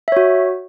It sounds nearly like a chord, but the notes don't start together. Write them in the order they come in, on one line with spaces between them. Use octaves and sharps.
E5 C#5 F#4